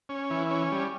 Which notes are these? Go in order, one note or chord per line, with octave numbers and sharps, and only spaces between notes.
C#4
E3
C#4
G3